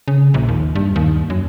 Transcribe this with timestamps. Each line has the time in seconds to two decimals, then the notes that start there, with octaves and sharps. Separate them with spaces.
0.08 C#3
0.34 A#1
0.49 D#2
0.75 G2
0.96 D#2
1.30 F#2